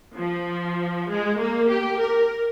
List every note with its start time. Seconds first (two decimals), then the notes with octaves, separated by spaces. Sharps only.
0.17 F3
1.09 G#3
1.40 A#3
1.70 G4
2.01 A#4